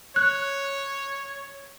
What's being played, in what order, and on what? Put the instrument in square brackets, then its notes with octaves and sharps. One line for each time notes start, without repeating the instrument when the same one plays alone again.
[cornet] C#5 [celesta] F#6